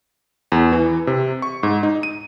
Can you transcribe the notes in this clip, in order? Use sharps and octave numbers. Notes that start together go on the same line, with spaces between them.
E2
E3
C3
C#6
G#2
D#4
D#7